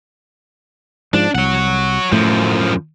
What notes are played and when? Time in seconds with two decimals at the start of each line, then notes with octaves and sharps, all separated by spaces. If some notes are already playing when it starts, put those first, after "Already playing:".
1.14 G#2 F3 D4
1.35 C2 C#5 F#5
2.12 F#2 A2 F3 A3